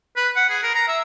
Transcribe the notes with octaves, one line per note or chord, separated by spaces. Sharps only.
B4
F#5
G#4
A#4
A#5
E5